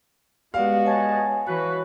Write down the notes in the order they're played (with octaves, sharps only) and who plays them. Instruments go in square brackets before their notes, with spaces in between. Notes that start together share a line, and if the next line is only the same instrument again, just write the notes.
[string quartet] G#3 B3 F#4 [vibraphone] G4 B4 D5 [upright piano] F5
[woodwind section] C#5 D#5 A5 [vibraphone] G#5 C#6
[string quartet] E3 [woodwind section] F#4 B4 [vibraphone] C#5 B5